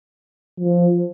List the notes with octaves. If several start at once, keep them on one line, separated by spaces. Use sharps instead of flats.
F3